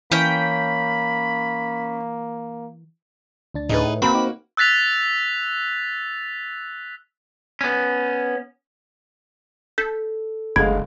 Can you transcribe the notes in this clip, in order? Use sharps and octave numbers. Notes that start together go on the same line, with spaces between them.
E3 A#3 C#4 G5 B5
D2 D4 A6
A2 D#4 G#4 B4
A#3 C4 F#4 A#4 B5
D#4 D6
E6 F#6 A6 B6 F7
B3 C#4
A4 G6 B6
F#1 D2 G#3 F5 B5 G#6 D7